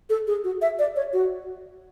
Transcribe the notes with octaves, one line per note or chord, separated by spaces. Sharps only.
A4
G#4
F#4
E5
D5
C#5
F#4